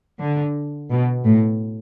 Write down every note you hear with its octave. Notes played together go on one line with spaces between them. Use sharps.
D3
B2
A2